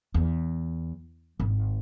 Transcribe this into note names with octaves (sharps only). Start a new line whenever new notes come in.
E2
G#1